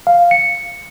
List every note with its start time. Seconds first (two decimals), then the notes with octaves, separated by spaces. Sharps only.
0.07 F5
0.31 C#7